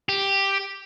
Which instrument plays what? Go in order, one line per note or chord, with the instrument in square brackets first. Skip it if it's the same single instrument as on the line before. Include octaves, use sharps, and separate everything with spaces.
[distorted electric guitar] G4